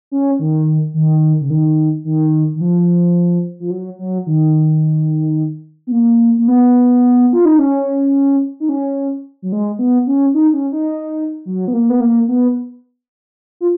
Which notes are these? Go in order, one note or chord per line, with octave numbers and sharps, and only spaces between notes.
C#4
D#3
D#3
C#3
D#3
D#3
D#3
F3
F3
F#3
F#3
D#3
B3
A#3
A#3
B3
F4
D#4
C#4
D#4
C#4
F#3
G#3
B3
C#4
D#4
C#4
D#4
F#3
B3
A#3
B3
A#3
B3
F4